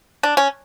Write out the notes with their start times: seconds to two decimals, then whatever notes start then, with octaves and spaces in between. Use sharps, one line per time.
0.23 D4
0.37 C#4